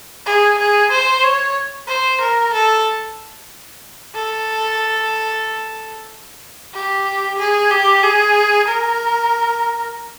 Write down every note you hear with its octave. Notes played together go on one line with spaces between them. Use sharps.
G#4
G#4
C5
C#5
C5
A#4
A4
A4
G4
G#4
G4
G#4
A#4